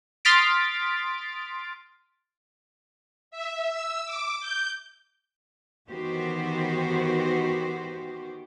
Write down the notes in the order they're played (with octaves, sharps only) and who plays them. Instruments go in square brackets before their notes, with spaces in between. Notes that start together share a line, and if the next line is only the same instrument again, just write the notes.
[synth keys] C6 D#6 F6 A6 B6 D7
[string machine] E5
E6
D6
G6
[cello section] D#3 E3 B3 F#4 G4 C5